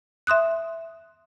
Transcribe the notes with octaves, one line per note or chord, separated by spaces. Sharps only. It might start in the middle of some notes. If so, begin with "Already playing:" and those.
E5 C6 D#6 F#6